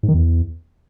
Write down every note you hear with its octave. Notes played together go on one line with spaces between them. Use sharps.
G#2
D#3
E2